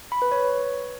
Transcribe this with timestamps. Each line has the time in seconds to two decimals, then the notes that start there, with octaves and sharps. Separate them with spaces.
0.12 B5
0.22 B4
0.32 C#5